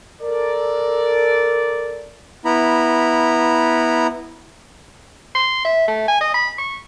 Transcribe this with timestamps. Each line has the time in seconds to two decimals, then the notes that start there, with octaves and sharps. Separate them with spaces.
0.21 A4 A#4 D5
2.45 B3 E4 A#5 B5
5.35 C6
5.65 E5
5.88 A3
6.08 G#5
6.21 D#5
6.34 B5
6.58 C#6